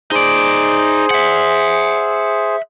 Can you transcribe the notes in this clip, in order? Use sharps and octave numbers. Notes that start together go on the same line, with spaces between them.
D#4 G#4 C5 D5
E5 F#5